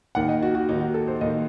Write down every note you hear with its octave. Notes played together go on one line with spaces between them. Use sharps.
D#2 D#3 F#5
D#5
F#4
F#4
D#2 D#3 D#4
F#4
A4
C5
D#2 D#3 D#5